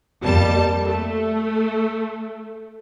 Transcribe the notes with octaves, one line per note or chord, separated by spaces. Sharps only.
F2 G3 A#3 A5
A3